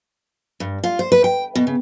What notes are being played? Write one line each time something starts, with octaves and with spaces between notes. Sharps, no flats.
G2
F4
C5
B4
G5
B2
C#3